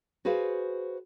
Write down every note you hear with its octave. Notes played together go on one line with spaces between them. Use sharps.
F#4 G#4 B4 C5 F5